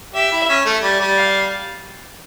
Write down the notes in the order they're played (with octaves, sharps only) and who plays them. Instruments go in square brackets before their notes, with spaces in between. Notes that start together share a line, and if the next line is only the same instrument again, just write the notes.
[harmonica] G4 [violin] E5
[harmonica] E4
C#4
A3
G3
G3
[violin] F5